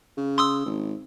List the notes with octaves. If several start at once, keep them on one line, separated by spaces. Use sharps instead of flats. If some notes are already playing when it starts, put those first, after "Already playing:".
C#3
C6 D#6 E6
G#1